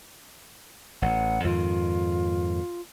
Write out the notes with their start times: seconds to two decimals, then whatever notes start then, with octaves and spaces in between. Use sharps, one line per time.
1.02 A1 F#5
1.44 F2 G#2 D#3 F4